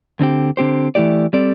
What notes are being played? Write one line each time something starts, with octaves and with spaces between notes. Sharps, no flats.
D2 D3 C4 G4
D3 C4 G4 C5
E3 A3 E4 G4 D5
G3 C4 A4 D5